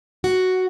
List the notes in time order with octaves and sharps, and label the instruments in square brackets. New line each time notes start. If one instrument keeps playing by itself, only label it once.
[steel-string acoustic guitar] F#4